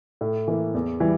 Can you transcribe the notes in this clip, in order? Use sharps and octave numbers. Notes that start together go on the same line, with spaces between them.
A2
E3 A#3
E2
E3 G3